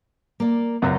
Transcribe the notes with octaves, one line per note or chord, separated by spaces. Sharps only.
A#3 D5
C#2 F#2 A#5